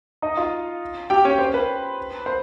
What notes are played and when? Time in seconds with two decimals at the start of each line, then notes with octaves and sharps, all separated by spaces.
0.22 D#4 D#5
0.37 F4 F5
1.10 G4 G5
1.25 C#4 C#5
1.39 C5
1.54 B4
2.26 C5